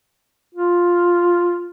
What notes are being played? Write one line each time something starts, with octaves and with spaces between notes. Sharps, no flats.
F4